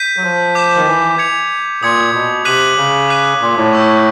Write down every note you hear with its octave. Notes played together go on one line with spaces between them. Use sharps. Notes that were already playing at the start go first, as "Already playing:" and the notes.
Already playing: G6 B6 D#7
F#3
F3
D6 G6 B6 E7
D#3
E3
G#6 C#7 F7
A#2 D#6 G#6 C#7
B2
C3 D6 F#6 B6 D#7 F#7
C#3
D6 F#6 B6 D#7
A#2
A2
C#6 E6 G6